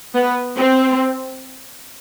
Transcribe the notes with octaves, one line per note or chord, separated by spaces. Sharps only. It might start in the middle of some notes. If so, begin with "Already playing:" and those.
B3
C4